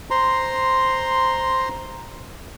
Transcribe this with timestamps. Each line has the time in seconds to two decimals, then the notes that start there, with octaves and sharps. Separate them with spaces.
0.11 C5 A#5 C6